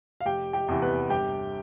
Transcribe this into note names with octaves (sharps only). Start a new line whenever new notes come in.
F5
F1 G4 G5
G4 G5
E2 C3 E3
B3 B4
G1 G4 G5